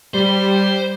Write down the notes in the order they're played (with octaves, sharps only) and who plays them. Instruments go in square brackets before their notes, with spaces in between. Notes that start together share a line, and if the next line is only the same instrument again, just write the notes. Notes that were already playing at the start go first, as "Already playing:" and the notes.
[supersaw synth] G3 [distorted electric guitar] C5